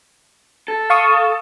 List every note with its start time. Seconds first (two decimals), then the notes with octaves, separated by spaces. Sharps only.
0.68 A4
0.90 F5 C#6 D#6